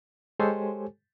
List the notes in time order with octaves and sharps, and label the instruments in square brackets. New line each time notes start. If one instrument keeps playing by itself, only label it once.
[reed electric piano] G#3 G4 A4 C5 C#5 G#5